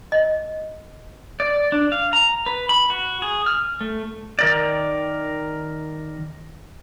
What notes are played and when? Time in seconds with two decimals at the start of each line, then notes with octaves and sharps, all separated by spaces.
0.12 D#5
1.40 D5
1.72 D4
1.92 F5
2.13 A#5
2.46 B4
2.69 B5
2.90 F#4
3.22 G#4
3.46 F6
3.81 A3
4.39 D#3 A#4 D5